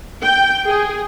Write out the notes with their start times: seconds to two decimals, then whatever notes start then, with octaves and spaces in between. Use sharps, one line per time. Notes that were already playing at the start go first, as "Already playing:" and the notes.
0.24 G5
0.66 G#4